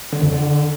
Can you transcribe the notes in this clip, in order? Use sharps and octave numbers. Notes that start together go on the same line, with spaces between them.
D3
F2
D3